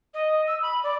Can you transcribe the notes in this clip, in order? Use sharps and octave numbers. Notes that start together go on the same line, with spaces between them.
D#5
E6
B5
D5